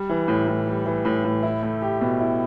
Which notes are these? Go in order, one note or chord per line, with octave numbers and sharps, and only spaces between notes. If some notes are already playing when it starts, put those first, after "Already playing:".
Already playing: G3
E3
A2
A2
G3
E3
A2
A2
E4
A3
G4
B2
E4